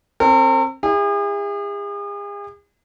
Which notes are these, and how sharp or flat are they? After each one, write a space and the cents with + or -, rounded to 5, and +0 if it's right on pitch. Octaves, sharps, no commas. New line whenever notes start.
C4 +30 A#4 -40
E4 +0 G#4 -40